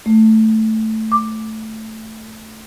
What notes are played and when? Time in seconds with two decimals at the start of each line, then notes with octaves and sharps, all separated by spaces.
0.06 A3
1.12 D6